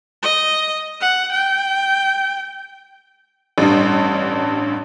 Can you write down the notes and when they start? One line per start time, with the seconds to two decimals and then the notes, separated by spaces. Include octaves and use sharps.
0.22 D#5
1.01 F#5
1.32 G5
3.58 A1 G2